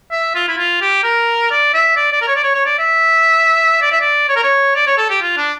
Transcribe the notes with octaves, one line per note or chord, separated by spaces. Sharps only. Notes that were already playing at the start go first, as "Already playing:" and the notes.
E5
F4
E4
F4
G4
A#4
D5
E5
D5
D5
A#4
C#5
D5
C#5
C#5
D5
E5
D5
E5
D5
C#5
A#4
C#5
D5
C#5
A4
G4
F4
D4